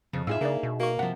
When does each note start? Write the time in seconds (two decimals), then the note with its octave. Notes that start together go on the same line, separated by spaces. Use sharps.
0.13 F2 C#3
0.27 A2 D#4 F4 G#4 E5 E6
0.41 C#3 A#3 D4 D5
0.63 B2
0.80 A#3 F#4 C#6
0.99 C3 F3 F#5